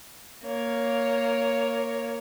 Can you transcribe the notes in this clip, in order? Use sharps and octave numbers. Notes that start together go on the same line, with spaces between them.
A#3 C#5